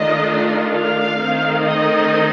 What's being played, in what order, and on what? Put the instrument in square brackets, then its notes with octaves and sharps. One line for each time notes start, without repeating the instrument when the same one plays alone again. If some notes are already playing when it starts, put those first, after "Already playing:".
Already playing: [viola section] D#3 A3 D4 F4 D#5
F5
D#3 A3 C4 D#4
D#5